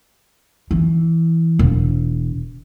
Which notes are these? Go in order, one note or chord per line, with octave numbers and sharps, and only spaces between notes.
E3
E1